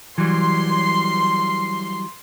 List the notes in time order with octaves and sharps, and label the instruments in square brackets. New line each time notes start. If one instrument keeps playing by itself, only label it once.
[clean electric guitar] E3 F#3 G3 [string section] C6